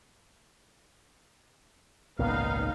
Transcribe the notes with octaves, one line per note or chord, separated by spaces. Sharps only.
G#1 C#2 A#2 B3 D#4 F5